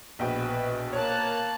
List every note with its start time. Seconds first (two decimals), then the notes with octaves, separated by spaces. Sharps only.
0.19 A#1 B2 B4 G5
0.93 A#3 C#5 A5 F#6